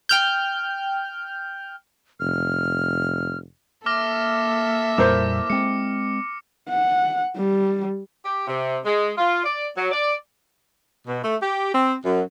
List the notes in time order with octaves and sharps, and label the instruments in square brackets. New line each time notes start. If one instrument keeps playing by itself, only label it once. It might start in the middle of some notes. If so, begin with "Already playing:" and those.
[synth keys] G5 F6 G6
[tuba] F1 [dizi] F6
[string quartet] A#3 A4 E5 [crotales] D6 F6 A#6
[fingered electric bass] F2 A#2 G3 [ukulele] E4 A#4 C5 [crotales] D6
[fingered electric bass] G#3 C4 [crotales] C#7
[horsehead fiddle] F#5
G3
[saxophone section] G4
C3
G#3
F4
D5
F#3
D5
B2
A3
G4
C4
F#2